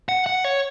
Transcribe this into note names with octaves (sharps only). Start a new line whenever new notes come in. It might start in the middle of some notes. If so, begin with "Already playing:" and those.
F#5
F#5
C#5